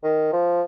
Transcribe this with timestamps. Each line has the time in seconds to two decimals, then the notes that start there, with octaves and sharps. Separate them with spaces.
0.04 D#3
0.33 F3